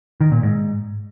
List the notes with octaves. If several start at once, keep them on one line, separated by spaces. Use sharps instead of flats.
D#3
A#2
G#2